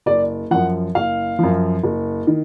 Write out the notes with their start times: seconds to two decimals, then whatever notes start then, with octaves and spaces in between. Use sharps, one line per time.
0.06 F#1 D5
0.51 F#2 F3 F#5
0.95 F#1 F5
1.39 F#2 F3
1.83 F#1
2.27 D#3